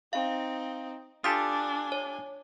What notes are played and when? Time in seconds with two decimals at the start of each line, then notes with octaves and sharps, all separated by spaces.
0.13 C4 D#4 F5
1.24 D4 F4 G4 A4 G#5 D#6
1.92 C#5